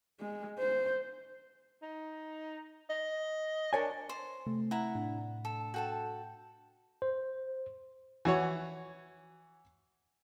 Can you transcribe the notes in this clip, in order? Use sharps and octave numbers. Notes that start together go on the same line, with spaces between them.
G#3
C5
D#4
D#5
D4 A#4 C#5 G#5
C5
C3 A3
E4 F#5 A#5
A2 D4
A4
F#4 A4 G5 A5
C5
E3 F#4 C#5